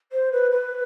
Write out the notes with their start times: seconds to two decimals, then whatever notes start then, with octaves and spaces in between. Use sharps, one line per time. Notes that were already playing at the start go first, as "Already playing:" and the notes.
0.12 C5
0.32 B4
0.50 B4